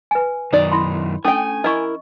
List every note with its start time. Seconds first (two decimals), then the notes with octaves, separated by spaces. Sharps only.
0.11 B4 G#5
0.53 F#2 D#3 D#4 D5
0.72 E4 B5 C6
1.25 A3 C#4 D4 G5 G#5 D#6
1.64 E4 A#4 D#5 C#6